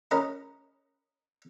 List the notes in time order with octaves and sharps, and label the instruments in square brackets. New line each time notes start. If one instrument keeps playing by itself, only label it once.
[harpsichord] C#4 A#4 D#5 B5